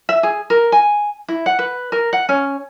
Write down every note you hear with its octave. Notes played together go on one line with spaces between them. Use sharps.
E5
G#4
A#4
G#5
E4
F#5
B4
A#4
F#5
C#4